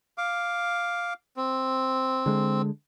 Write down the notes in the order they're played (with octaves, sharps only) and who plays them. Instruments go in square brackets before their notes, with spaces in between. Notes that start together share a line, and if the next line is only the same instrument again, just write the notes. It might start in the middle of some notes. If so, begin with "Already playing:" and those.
[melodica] F5 D6
C4
[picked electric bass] D3 G#3